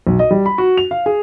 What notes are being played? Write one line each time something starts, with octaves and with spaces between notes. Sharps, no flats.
B1
D#5
G3
B5
F#4
F7
F5
G#4